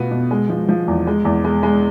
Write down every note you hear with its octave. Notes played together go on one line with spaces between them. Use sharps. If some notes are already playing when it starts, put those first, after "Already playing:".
Already playing: B2 A3 B3 F4
B2
G#3
F3
F3
E2
G#3
E2
G#3
G#3